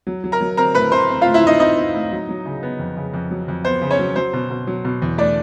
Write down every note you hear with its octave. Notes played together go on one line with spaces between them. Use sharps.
F#3
F#3
A#4 A#5
F#3
C4 A#4 A#5
A2 B4 B5
A3 C5 C6
C4
A2 F4 F5
E4 E5
A2 D#4 D#5
C4 D#4 D#5
C4
A2
F#3
F#3
C#3
B3
F2
C#3
F2
F#3
F2
B3 C5
C#3
C#4 C#5
F#3
F#3 C5
B2
B2
F#3
B2
E2
A3 D4 D5